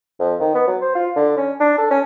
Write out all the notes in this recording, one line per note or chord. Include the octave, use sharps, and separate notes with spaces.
F2
D#3
B3
F#3
C5
F4
D3
C#4
D4
A4
C#4